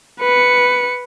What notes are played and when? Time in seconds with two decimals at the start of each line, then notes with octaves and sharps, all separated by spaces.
0.20 B4 C#7